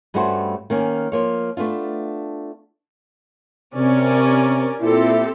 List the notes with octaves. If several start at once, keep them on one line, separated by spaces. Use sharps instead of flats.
G2 G3 A3 C#4 F#4 C5
D#3 A#3 C#4
F3 A#3 C#5
A3 B3 D4 F4
C3 C#4 A#4 D5
A#2 C4 E4 G4 A4